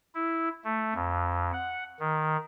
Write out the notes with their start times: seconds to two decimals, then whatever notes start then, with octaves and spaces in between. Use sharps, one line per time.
0.15 E4
0.64 A3
0.95 F2
1.53 F#5
2.00 D#3